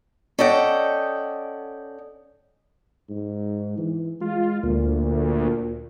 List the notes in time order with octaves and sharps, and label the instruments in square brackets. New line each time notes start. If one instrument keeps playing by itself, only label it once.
[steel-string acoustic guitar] C#4 A4 D5 D#5 F#5 G5
[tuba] G#2
E3
[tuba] G#3 [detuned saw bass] F4
[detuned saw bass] D2 [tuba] A#2